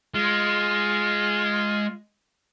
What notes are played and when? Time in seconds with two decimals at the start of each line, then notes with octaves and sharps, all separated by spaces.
0.15 G#3 F4